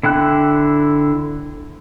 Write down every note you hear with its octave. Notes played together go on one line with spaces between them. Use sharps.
D3 E4 G5 F#6